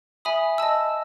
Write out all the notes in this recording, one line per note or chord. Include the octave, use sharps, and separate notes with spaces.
E5 G#5 B5 D#6
D#5 A5 E6